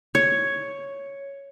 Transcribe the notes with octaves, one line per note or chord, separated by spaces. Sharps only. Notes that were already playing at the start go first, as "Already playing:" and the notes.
C#5